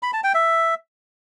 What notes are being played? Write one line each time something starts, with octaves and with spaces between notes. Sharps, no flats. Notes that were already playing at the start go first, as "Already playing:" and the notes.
B5
A5
G5
E5